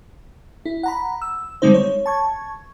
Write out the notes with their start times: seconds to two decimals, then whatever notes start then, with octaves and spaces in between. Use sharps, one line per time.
0.66 E4
0.83 F#5 A#5 B5
1.22 E6
1.62 D3 G3 G#3 C4 D#4 C5
1.74 C#5
2.06 A5 C#6 G#6